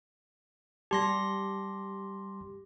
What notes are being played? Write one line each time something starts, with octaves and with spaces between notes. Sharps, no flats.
G3 G4 A5 C6 A#6